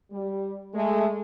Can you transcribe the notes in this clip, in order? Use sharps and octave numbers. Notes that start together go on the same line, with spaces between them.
G3
G#3 A3